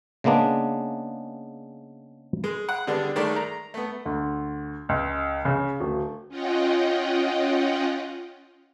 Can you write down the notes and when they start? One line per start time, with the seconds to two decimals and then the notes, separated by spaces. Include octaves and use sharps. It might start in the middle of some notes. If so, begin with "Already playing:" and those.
0.24 C#3 G#3 A#3 B3 D4
2.44 G#3
2.69 F#5
2.87 D3 G3 G#3 B3 D4
3.16 D#3 G#3 A3 D5
3.36 A#5
3.74 A3 B3
4.06 D2
4.89 C#2
5.45 C#3
5.80 D1
6.29 C#4 F4 D#5 F#5 G5